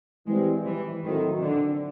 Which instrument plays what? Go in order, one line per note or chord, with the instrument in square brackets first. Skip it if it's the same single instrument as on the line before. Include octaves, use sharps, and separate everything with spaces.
[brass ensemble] E3 G3 C4 [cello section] G#3
[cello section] E3
[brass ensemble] A2 F#3 A3 C4 [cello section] D#3
[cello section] D3